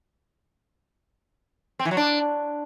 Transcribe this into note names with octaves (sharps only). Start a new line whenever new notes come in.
C4
E3
F#3
D4